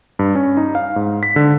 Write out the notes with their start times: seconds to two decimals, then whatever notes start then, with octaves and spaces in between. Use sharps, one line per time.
0.19 G2
0.35 C#4
0.57 D#4
0.75 F5
0.96 G#2
1.23 B6
1.36 D3